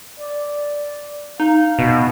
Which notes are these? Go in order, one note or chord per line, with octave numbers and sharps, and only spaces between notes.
D5
D#4 F5
B2